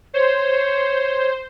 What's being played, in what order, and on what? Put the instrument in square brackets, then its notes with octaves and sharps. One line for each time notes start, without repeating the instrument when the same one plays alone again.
[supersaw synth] C5 [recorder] C#5